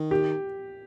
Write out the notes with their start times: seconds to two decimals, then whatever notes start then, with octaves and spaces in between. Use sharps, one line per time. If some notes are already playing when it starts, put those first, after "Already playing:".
Already playing: D#3
0.11 G4